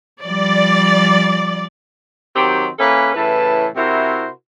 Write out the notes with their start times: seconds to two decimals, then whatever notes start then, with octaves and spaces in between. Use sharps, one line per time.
0.24 F3 G3 D5
2.36 D#3 F#3 C4 G4
2.79 E3 A#3 C#4 A4 B4
3.14 A2 C#3 E3 B4 A5
3.76 C3 E4 F#4 A#4 C5